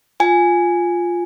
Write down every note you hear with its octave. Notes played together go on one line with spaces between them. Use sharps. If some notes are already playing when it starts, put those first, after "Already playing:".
F4 G#5